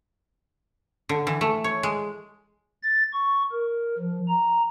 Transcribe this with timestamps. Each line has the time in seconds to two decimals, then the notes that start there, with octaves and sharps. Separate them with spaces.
1.09 D3
1.27 E3
1.41 A3
1.64 C#5
1.83 G#3
2.83 A6
3.14 C#6
3.52 A#4
3.98 F3
4.28 A#5